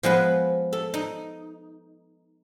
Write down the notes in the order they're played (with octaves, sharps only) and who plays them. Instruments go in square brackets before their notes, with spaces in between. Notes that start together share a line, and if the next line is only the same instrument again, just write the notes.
[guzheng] F3 G#3 B3 B4
A4
D#4